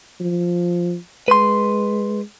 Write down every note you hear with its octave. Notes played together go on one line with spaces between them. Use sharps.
F3
G#3 B4 C6